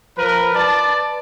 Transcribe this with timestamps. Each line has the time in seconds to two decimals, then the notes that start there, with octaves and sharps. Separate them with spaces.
0.18 F3 A#4 B4
0.54 B4 D5 A5